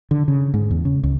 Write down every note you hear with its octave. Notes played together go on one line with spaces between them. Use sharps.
D3
C#3
G#2
E2
C#3
C#2